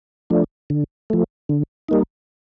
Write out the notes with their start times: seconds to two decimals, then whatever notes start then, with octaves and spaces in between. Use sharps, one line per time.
0.30 F3 A3 D4
0.70 D3
1.10 F3 A3
1.49 D3
1.89 G3 A#3 D#4